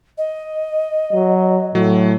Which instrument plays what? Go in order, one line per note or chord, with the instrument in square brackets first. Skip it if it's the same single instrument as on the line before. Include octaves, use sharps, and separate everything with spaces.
[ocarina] D#5
[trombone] F#3
[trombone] A2 [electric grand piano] F#3